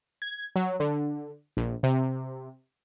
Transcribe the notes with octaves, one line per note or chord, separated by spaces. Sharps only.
G#6
F#3
D3
A#1
C3